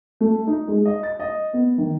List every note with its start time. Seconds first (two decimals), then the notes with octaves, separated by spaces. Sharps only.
0.21 A3
0.47 D#4
0.68 G#3
0.85 D#5
1.03 A6
1.20 D#5
1.53 B3
1.78 D#3